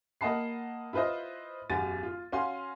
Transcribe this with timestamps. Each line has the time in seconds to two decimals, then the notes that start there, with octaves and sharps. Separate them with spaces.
0.21 A#3 D#5 F#5 A5 B5 C7
0.93 E4 F4 B4 C5 D#5
1.70 E1 F#2 F#4 G4 A6 D#7
2.03 F4
2.32 C#4 F#4 F5 G#5 C6